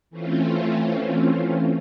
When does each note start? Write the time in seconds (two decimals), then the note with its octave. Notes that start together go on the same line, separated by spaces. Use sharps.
0.10 E3 A3 C4 C#4 F4